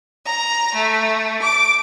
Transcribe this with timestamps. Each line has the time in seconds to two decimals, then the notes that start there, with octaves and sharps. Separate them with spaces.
0.24 A#5
0.74 A3
1.40 D6